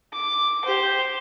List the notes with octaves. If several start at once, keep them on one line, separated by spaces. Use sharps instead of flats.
D6
G4 C5